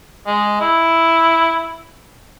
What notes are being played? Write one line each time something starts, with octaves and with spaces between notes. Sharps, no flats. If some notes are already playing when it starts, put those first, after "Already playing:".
G#3
E4